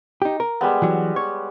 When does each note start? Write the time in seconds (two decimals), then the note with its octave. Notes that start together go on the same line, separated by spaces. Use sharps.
0.22 D#4 G4
0.40 A#4
0.61 G3 G#3 B3
0.82 E3 F#3 F#4
1.16 C#5